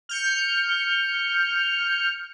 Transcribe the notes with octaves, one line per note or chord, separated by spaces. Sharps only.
F6 G6 C#7